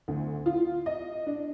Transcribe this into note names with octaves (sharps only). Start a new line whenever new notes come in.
D2
F4
D#5
D4